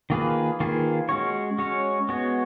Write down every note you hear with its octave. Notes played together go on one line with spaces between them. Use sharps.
D#3 A#3 F4 G#4 B4
D#3 A#3 F4 G#4 B4
G#3 C#4 F#4 C#5
G#3 C#4 F#4 C#5
G#3 B3 F#4 C#5